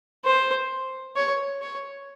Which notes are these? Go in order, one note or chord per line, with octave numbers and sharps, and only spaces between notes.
C5
C#5
C#5